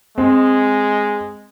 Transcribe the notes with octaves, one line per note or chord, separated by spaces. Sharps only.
G#3 C4